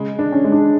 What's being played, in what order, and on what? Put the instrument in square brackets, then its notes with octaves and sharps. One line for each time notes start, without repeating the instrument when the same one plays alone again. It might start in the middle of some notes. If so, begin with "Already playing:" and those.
Already playing: [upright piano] C#3 G#3
D4
[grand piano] C#4
[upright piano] G#3
[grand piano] D4